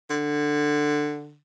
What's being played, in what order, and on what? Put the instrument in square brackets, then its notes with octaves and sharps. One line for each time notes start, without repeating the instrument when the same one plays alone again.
[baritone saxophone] D3